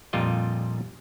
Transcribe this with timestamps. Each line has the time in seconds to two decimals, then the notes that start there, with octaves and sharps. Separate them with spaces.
0.13 F2 A#2 G3 F4 D#5